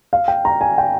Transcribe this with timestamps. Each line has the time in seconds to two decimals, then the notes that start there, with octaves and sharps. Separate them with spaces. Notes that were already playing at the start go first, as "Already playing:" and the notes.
0.13 F5
0.28 G5
0.45 A#5
0.61 G#5
0.78 G5